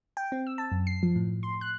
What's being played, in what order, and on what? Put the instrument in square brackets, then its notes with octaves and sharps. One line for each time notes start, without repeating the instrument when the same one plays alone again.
[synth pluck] G5
C4
E6
A5
F#2
C7
F3
A2
C6
F#6